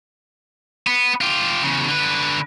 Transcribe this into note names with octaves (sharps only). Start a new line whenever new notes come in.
B3
F4 G4
E2 C#3
D3 B4